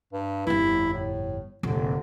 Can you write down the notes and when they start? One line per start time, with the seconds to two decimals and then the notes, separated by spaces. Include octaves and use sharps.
0.13 G2
0.47 G1 F2 E4
0.93 A2
1.63 F1 A#1 D3